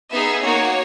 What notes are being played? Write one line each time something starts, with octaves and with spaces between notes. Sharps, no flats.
B3 D#4 G#4 E5
A#3 D#4 F#4 C#5